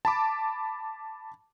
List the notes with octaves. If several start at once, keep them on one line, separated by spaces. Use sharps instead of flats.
A5 B5 D6